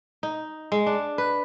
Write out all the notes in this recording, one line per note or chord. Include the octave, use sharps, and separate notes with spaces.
D#4
G#3
D4
B4